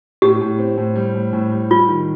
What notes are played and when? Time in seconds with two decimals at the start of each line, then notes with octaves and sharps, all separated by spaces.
0.22 A2 G4
0.41 A2
0.59 C4
0.77 A2
0.95 G3
1.15 A2
1.33 A2
1.52 G3
1.70 G3 F4
1.88 D#3